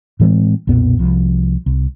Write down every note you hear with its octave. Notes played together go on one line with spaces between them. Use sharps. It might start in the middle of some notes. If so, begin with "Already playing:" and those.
A2 E3 G#3 C4
B1 F2 A#2 B3
C2 F3
C2